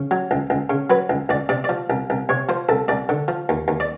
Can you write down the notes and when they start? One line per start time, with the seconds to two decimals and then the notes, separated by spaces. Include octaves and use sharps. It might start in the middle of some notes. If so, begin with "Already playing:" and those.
Already playing: C#3
0.11 F#3
0.31 C#2
0.50 C#2
0.70 C#3
0.90 F#3 B4
1.10 C#2
1.29 C#2 D5
1.49 C3 D5
1.64 F3 D5
1.90 C2
2.10 C2
2.29 C3 C#5
2.49 F3 C5
2.69 C2 A4
2.88 C2 D5
3.09 D3
3.28 F3
3.49 D#2
3.68 D#2
3.80 D5